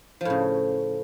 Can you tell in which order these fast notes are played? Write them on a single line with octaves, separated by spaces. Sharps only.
F3 A2 C#3